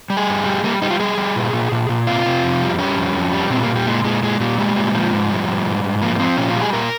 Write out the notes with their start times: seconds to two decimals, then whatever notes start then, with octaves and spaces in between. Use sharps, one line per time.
0.10 G3
0.17 G#4
0.28 G2
0.46 G3
0.64 G3 A#3
0.82 G3 D#4
0.91 F4
1.00 G3 G#4
1.18 G3
1.36 A#2
1.53 A#2
1.72 A#2
1.89 A#2
2.07 C3 F4
2.26 C3
2.44 F2
2.62 G3
2.79 G3 C#4
2.96 F2
3.15 F2
3.33 G3
3.50 A#2 C4
3.63 A#3
3.68 A#2
3.75 G3
3.86 A#2 G#3
4.04 A#2 G#3
4.23 A#2 G#3
4.40 A#2 G3
4.58 G3 G#3
4.76 A#2
4.94 F3
5.12 G#2
5.29 F3 G3
5.48 G#2
5.65 G#2
5.84 G#2
6.02 F3 A#3
6.16 A#3
6.19 F3 C4
6.37 A#2 C#4
6.50 F4
6.55 G3
6.61 G#4
6.73 A#2 A#4